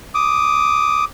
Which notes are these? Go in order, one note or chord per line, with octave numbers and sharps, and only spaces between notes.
D6 D#6